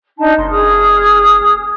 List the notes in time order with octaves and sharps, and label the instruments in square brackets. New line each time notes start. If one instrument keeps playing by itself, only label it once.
[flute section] D4 D#4 A5
[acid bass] F#1 [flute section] C6
[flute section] G#4 D#6 F6